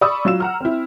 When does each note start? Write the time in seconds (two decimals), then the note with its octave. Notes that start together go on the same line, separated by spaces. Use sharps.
0.01 D5 B5 C#6 D#6 E6
0.25 F#3 F4 E6 E7
0.40 F#5 A#5 F6
0.60 C4 E4